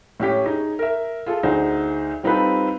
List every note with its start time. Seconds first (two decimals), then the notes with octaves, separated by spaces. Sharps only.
0.20 A2 C#4 G4 B6
0.46 D#4 G#4
0.79 A#4 E5
1.26 F4 G#4 A4
1.43 D2 D#4 G#4 C5 F#5
2.23 G3 C4 D#4 F4 A4 B4